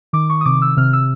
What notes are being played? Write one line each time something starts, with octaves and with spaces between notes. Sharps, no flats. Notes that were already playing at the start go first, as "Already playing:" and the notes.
D#3 D6
C#6
D#6
C3 D6
E6
C3 F6
E6